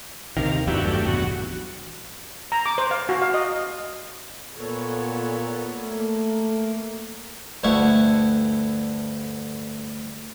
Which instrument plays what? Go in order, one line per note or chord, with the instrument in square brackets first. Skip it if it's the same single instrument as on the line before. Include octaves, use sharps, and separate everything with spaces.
[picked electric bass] D#2 C3 D#3 [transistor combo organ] A#4 F5
[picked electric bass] G#1 E2 G2 [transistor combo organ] E4 F#4 G4
[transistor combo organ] F#3 A3 G4
B2 F#3 F#4
[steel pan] A#5
D6
C5
F5
F#4
F5
D#5
[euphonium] A#2 [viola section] B3 A4 C#5
[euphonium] A3 [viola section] A#3
[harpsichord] D2 G2 D3 E4 F#5 C#6